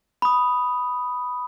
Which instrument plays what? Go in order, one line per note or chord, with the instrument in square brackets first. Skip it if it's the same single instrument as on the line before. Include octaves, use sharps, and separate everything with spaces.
[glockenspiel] B5 D#6